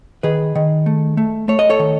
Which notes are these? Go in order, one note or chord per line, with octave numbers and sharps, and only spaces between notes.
D#3 G#4 B4
D#3
A3
A3
A3 C#5
D#5
A4 C#5
D#3